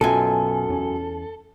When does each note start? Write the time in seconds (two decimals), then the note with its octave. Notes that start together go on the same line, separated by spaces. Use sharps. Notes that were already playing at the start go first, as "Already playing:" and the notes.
0.01 B1 F#2 B2 F4 A4 G#5
0.69 E2 B3 C#4